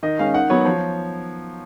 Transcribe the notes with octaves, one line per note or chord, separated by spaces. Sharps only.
D#3 D#5
G#3 C#4 F5
D#3 F#5
F#3 B3 C#5
F3 C#5